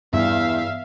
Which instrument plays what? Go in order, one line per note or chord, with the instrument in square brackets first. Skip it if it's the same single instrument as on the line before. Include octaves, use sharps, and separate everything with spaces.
[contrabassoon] E2 [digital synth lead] G2 [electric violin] E5 F5